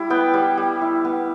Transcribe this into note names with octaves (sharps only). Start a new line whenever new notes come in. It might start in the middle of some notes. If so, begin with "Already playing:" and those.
Already playing: G3 E4
B3 G5
G3
G3
E4
B3